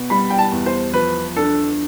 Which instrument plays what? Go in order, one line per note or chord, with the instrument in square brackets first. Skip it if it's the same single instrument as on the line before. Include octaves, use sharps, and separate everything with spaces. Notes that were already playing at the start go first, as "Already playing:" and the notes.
Already playing: [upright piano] B2 B3
[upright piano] G3 [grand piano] B5
[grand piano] G5
A5
[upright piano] E2
[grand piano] C5
[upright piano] F3 [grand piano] B4
[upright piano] D4 [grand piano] A4